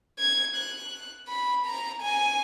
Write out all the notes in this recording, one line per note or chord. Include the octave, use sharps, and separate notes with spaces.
G#6
F#6
B5
A#5
G#5